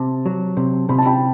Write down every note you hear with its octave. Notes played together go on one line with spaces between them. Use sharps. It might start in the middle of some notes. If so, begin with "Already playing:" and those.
Already playing: C3 A5
F#3
C3
C3 B5
A5
G5 B5